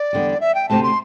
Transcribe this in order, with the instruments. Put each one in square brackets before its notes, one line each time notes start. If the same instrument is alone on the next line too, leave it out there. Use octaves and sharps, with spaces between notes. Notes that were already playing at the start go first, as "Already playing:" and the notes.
Already playing: [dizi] D5
[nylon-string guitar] E2 D3 G3
[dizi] E5
G5
[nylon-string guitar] D2 C3 A3 C4 G4 [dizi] A5
[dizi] C6